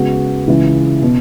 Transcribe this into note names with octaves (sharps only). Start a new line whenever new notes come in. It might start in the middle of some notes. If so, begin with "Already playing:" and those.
Already playing: C#3 G#3 B3 F#4
C#2 C#3 E3 C#4 E4
B2 B3 F#4